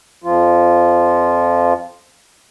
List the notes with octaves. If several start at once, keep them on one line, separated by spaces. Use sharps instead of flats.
F2 F3 F4